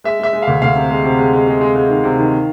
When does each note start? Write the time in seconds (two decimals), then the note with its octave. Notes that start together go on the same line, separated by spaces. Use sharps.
0.04 G#3 E5
0.19 G#3 E5
0.33 G#3
0.42 D2 F5
0.62 D2 F5
0.75 C3
0.91 G#3
1.04 C3
1.19 G#3
1.33 G#3
1.47 G#3
1.61 G#3
1.76 G#3
1.89 D#3
2.04 C3
2.18 D#3